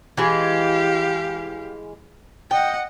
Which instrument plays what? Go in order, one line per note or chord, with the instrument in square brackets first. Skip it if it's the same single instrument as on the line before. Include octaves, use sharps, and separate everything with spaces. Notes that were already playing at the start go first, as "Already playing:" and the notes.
[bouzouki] E3 G#3 [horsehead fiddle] G4 F5
[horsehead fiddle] D#5 F#5 [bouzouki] G5